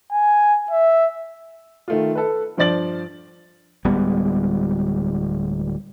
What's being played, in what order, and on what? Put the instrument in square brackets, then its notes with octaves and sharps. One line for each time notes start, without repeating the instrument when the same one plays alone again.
[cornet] G#5
E5
[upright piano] D#3 A3 F4
A4 B4
G2 F3 C5 D5 A6 F#7
[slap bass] D1 G3 G#3 B3